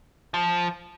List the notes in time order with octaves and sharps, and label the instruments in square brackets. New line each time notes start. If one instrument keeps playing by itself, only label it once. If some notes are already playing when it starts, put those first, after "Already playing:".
[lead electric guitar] F3